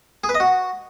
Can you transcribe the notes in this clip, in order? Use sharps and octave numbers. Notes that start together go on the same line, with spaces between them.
G#4
B4
D#5
F#4